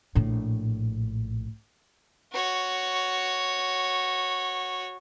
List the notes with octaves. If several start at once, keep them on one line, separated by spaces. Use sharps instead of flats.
A#1 A2
F#4 C#5